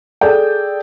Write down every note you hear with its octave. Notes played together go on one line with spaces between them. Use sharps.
G#4 A4 D5 G5